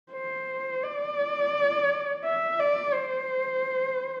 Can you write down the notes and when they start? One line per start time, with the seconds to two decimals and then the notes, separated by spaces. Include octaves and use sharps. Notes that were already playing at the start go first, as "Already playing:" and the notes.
0.12 C5
0.84 D5
2.25 E5
2.60 D5
2.95 C5